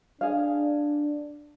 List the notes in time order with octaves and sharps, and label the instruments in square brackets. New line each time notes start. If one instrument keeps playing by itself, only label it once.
[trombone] D4 [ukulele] G#4 F5